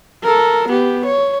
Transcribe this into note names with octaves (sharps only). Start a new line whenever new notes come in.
A4 A#4
B3 G4
C#5